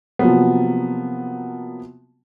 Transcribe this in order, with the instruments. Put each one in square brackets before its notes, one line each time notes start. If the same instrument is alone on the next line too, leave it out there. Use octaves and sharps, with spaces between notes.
[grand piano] C3 F3 F#3 A#3 B3